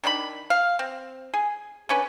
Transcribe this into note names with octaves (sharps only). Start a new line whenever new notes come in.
D#3 D4 G#4 B5
F5
C4
G#4
D3 C#4 B4